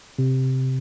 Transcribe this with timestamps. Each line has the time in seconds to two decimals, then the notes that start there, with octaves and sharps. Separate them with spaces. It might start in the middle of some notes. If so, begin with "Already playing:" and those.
0.19 C3